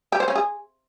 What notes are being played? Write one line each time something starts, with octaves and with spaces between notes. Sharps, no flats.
G4
C5
C#4
G#4